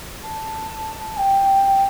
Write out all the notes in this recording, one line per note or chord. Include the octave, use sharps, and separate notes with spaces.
A5
G5